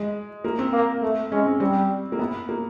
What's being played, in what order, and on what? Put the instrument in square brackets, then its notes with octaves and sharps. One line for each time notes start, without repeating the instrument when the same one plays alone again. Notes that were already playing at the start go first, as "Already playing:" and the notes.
Already playing: [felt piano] G#3
A#3
C4
[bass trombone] A#3
A3
[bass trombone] G#3 [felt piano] C#4
[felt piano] C4
[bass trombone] G3 [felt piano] C4
[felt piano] A#3
B3
A#3